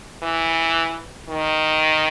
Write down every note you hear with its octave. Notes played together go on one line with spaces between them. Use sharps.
E3
D#3